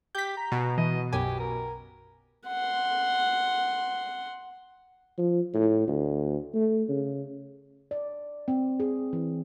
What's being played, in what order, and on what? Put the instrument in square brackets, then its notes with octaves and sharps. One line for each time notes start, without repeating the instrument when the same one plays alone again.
[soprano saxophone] G4 [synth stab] G6 B6
[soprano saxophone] A#5
[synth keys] B2
[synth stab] E3 [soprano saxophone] D#5
[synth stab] B1 F#2 G#5 [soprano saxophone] G4
[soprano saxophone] A#4
[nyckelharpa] F#5 C6
[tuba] F3
A2
D2
A3
C#3
[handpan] D5
C4
G#4
E3